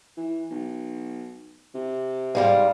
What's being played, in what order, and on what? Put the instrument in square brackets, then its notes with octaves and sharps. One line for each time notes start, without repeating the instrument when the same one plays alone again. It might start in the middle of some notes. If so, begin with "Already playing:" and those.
[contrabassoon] E3
B1
C3
[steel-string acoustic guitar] G#2 G3 G#3 [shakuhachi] F5